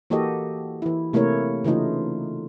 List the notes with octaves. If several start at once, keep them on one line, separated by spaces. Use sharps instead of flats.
E3 A#3 F#4 G4 A4 D#5
E3 E4
C3 A3 A#3 E4 A#4 C#5
C#3 E3 A3 D#4 F4